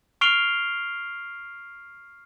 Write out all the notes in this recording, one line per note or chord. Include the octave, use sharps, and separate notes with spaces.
C#6 F6 C7 D7 F7 G7